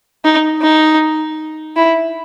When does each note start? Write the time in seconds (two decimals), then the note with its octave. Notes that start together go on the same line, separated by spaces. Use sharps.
0.25 D#4
0.62 D#4
1.77 E4